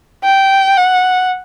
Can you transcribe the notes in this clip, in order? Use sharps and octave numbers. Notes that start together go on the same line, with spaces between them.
G5
F#5